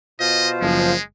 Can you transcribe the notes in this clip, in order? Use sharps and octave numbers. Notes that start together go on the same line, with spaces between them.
B2 F4 C5 D#5
F#1 F3 G#3